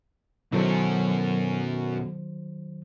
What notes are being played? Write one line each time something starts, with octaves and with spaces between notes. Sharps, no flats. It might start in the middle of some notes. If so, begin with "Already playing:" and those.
F#2 B2 D#3 F#3 C#4 E4 A4 C5